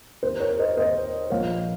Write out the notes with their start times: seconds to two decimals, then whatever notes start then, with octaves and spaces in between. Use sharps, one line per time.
0.23 D#2 D#3 C5
0.40 A#4 C#5
0.59 C5 D#5
0.77 D#2 D#3 C5 D#5
1.30 A#1 A#2 F3 C#5 F5